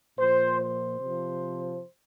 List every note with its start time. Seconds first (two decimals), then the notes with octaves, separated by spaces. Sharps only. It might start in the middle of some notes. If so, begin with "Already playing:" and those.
0.19 A#2 F3 C5
0.60 C5
1.00 C3 F3